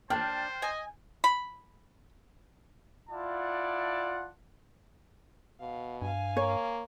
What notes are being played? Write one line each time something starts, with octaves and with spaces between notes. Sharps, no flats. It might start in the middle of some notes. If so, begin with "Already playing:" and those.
D4 C5 G5 A5 F6 G6
D#5 G#5
B5
E4 F4 D5 F#5 A5
B2 F5
G2 F5 G#5
A#3 C#5